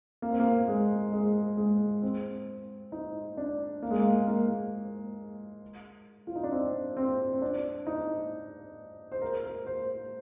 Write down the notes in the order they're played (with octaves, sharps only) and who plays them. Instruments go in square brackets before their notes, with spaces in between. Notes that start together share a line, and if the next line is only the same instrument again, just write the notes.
[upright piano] A#3
C4
A#3
G#3
G#3
G#3
C4
D#4
D4
A#3
G#3
A#3
A#3
F4
D#4
D4
C4
C4
C4
D4
D#4
C5
A#4
A#4
C5